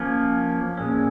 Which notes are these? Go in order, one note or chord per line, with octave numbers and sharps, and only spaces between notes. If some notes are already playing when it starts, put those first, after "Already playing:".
Already playing: F3 A#3 C#4
A#2 G#3 C#4